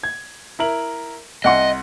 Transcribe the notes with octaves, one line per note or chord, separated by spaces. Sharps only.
G#6
E4 A#4 F#7
C2 D#5 F#5 C6